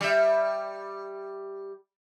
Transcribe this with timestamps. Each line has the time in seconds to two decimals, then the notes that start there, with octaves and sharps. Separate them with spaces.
0.01 G3 E5